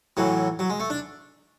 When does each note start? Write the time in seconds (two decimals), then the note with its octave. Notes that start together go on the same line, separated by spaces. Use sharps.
0.17 A2 E3 F#3
0.59 F#3
0.70 G#3
0.80 A3
0.90 D4